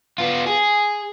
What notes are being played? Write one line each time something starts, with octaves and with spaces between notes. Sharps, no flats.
B3 F4
G#4